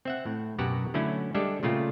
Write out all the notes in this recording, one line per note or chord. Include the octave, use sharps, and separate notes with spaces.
C4 E5 F#5
A2
F#2 B2 F#4 G4 F#5 A#5
D3 F#3 A3 C#4 E4
G3 G#3 D4 G4 A4 E5
A#2 C#3 A3 F4 G4